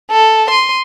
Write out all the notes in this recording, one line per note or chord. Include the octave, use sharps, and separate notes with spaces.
A4
C6 D#7